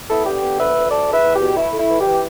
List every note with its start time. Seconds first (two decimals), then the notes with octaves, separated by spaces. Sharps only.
0.10 B3 E4 A4
0.26 D3 G4
0.43 B3
0.59 D2 B4 E5
0.76 D2
0.91 A3 A4 D5
1.08 E2
1.13 B4 E5
1.24 E2
1.35 G4
1.41 B2
1.57 A3 E4
1.73 A3
1.79 E4
1.89 E3
2.01 G4
2.06 E3